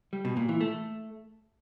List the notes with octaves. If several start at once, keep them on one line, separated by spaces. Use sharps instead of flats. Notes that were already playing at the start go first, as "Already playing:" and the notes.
G3
B2
A#2
E3
A3